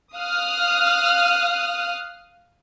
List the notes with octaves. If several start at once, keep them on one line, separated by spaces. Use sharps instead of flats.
F5 D#6 F6 F#6